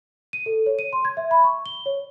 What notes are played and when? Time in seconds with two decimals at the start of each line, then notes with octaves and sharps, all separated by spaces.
0.33 D#7
0.46 A4
0.66 C#5
0.79 D#7
0.93 C6
1.05 G#6
1.17 E5
1.31 B5
1.44 C#6
1.66 G7
1.86 C#5